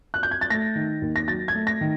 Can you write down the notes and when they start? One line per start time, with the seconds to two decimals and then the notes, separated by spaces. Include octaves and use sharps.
0.14 F#6
0.23 G6
0.31 G#6
0.41 A6
0.50 A3 A#6
0.75 D#3
1.02 D#2
1.16 A#6
1.28 F#3 A6
1.48 G#6
1.55 A3
1.67 A#6
1.81 D#3